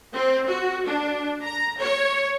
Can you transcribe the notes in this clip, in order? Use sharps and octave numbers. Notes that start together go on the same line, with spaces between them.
C4
F#4
D4
A#5
C#5